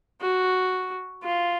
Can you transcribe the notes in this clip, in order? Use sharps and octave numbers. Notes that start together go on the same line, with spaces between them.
F#4
F4